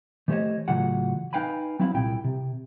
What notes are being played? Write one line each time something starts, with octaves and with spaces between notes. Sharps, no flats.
E3 A3 G4 C5 C#5 D#5
A2 C#3 E3 F#3 F4 F#5
D#4 B4 F5 G5 G#5 B5
F#3 C4 E4 F5 B5
C2 A#2 E4 G5
C3